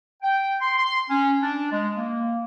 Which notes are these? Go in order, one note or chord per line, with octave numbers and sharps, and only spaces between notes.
G5
C6
C6
C#4
D4
G#3
A#3